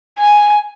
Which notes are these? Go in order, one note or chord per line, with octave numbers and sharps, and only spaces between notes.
G#5